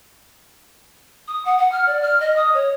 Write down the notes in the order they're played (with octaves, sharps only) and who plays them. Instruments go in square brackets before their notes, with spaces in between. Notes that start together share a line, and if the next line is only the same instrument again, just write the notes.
[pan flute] D#6
F#5
F#5
F6
D5
F6
D#5
D#6
C#5